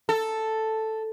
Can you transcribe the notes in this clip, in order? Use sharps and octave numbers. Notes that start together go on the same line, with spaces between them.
A4